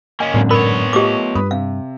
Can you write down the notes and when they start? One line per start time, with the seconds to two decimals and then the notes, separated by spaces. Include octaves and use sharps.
0.20 A#3 C#4 D#5 G#5
0.34 G#1 F#2 A2 D3 C4
0.51 B3 A#4 C#5 B5
0.93 A3 F4 G4 D#5 D6
1.35 G2 B4 B5 D#6
1.51 C3 F5